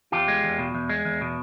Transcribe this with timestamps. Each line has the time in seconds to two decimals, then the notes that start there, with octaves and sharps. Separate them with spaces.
0.12 E2 F4 G4
0.28 G#3
0.44 E2
0.59 B2
0.75 E2
0.89 G#3
1.05 E2
1.21 B2